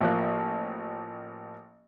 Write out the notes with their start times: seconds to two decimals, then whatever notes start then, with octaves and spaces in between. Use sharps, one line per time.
0.01 A1 F3 A#3 F#6